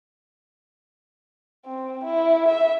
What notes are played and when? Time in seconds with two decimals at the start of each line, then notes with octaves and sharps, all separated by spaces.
1.66 C4
2.04 E4
2.48 E5